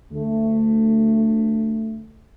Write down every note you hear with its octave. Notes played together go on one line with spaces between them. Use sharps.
D2 A3